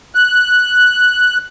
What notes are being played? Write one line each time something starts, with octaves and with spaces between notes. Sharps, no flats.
F#6